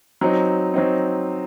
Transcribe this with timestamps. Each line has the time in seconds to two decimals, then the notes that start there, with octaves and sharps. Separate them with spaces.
0.21 F#3 C4 D#4
0.74 F#3 C4 D#4